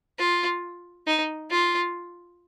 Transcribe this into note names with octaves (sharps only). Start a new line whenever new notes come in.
F4
D#4
F4